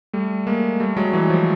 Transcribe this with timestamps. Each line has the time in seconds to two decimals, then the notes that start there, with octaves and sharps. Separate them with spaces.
0.13 G3 A3
0.47 G#3 A#3
0.80 G3 A3
0.97 F#3 G#3
1.13 E3 F#3
1.30 F3